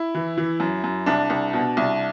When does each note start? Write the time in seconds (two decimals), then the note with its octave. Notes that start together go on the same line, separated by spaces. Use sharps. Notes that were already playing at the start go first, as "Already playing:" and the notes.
Already playing: E4
0.15 E3
0.38 E3
0.60 F#2
0.84 F#2
1.06 C2 D4
1.30 C2
1.53 B2
1.77 C2